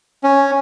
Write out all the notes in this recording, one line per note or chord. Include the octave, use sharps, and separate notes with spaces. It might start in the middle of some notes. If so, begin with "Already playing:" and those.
C#4